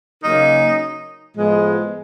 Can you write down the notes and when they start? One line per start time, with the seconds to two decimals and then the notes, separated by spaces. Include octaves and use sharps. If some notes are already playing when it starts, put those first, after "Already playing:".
0.24 C#3 F#3 A#3 C#4 D#4
1.35 A2 F3 G#3 B3